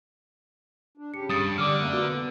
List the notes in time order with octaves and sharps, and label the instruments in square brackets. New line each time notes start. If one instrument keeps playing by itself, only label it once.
[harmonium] D4
[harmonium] C#3 G4 [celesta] C#7
[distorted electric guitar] G2 [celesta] D#6 A6 C#7
[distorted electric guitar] D3 [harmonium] G3 [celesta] D6 F6
[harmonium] F#2 A3 A#3
[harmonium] B3 [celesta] F#4